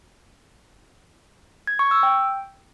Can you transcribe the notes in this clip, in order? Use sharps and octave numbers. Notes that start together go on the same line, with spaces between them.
G#6
C#6
E6
G5